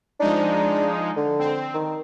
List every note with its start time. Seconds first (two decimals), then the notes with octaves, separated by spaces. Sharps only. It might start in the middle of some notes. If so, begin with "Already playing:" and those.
0.20 F3 G#3 D4 D#4
1.17 D3
1.39 C4
1.74 D#3